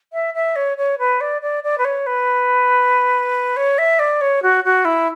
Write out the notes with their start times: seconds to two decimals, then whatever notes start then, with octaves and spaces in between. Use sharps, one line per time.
0.13 E5
0.34 E5
0.55 C#5
0.77 C#5
0.98 B4
1.20 D5
1.41 D5
1.63 D5
1.78 B4
1.84 C#5
2.06 B4
3.56 C#5
3.78 E5
3.99 D5
4.21 C#5
4.42 F#4
4.64 F#4
4.85 E4